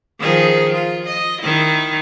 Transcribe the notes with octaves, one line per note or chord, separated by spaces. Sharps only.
D#3 F3 G#4
F4
D#5
D#3 E4